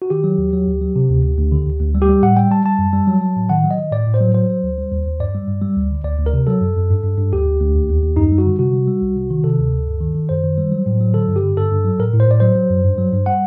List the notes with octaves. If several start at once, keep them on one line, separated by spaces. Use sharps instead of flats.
F#4
D#3 G4
F#3
D#2
F#3
D2
F#3
C3
D2
D2
D2
D3
D2
D2
G3
G4
G3
A2 F#5
G3 G5
G3 A5
G3 A5
F#2
G3
F#3
F#3
A2
D#3 F#5
F#3
D#5
D#3
A2 D5
A2
C5
F#3
F#3 C5
F#3
D2
G3
D#2
D#2
G2 D5
G3
G2
G3
D2
D3
D2 D5
D2
A#4
C3
F#3 A4
F#2
F#2
G2
G2
G2
D2 G4
D2
D2
D#2
D#2
D#2
F#2 D#4
G3
F#4
D3
C3 F#4
G3
G3
C2
C3
D#3
C3 A4
D2
D2
G2
D#3
D#3
F#2 C5
D#3
G3
F#3
A2
F#3
D3 A4
G2
G4
D3
G2 A4
G2
F#3
A2 A#4
A2
C5
A2 D5
F#3 C5
F#3
F#2
G2
F#3
G2
G3 F#5